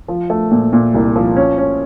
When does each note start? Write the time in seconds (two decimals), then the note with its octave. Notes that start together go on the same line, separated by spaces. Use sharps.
0.08 F3
0.30 A3
0.51 A#2
0.73 A#2
0.94 C2
1.16 F3
1.37 C#4
1.58 C#4